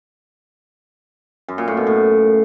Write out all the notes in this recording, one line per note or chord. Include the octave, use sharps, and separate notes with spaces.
F#2
A#2
A2
B2
A2